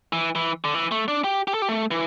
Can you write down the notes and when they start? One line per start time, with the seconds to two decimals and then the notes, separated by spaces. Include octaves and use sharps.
0.13 E3
0.35 E3
0.64 D3
0.74 E3
0.91 A3
1.08 D4
1.24 G4
1.48 G4
1.54 A4
1.62 G4
1.69 A3
1.91 E3